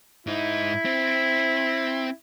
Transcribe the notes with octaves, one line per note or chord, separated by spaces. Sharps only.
G#2 D#4 E4
C4